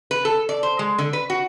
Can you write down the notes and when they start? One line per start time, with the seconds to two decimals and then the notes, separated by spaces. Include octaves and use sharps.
0.11 B4
0.25 A4
0.49 D5
0.63 C5
0.79 G#3
0.99 D3
1.13 B4
1.30 F#4